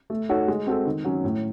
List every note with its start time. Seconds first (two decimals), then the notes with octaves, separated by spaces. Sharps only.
0.10 A3
0.29 D#4 F#4 A4 C#5
0.48 G#3
0.67 C4 F#4 A4
0.86 D#3
1.05 F#3 C#4
1.24 A2